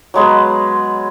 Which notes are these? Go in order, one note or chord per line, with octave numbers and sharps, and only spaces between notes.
F#3 G#3 B3 G#4